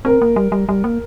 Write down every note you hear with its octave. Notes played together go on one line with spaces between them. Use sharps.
C4 A#4
A#3
G3
G3
G3
A#3